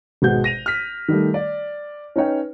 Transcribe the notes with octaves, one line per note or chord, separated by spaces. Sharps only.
G#1 B2 G#3 F#5 G6
A#6 D#7 F7
F6 B6
D#3 G3 A3
D5
C#4 D#4 B4 C#5 G5